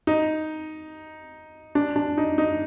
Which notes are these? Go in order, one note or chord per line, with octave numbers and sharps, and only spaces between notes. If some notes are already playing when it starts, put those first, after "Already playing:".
D#4
D4
D4
D#4
D#4